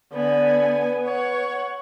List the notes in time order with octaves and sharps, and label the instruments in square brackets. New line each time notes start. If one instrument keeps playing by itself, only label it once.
[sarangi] D3 [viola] B3 G#5 [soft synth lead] B4
[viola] C#5 [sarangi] F#5